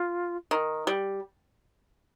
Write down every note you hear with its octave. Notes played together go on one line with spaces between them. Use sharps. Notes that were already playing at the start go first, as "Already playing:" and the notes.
Already playing: F4
D#3
G3